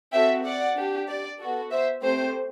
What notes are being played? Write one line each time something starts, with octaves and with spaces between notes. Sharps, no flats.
C4 F#4 A4 E5 G5
D5 F#5
D4 G4
D5
B3 F#4 A4
C5 E5
A3 C4 G4 C5